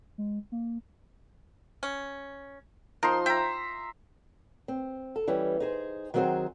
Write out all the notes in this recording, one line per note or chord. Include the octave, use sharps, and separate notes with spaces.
G#3
A#3
C#4
F3 D#4 A#4 C6
E5 G5 A#5
C4
A4
E3 G3 C#4
D#4 G#4 C5
D#3 F#3 C4 F#4 G#4 C5